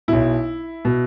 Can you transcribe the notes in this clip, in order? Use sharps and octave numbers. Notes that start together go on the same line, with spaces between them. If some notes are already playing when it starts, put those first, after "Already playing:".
B1 B2 E4
B2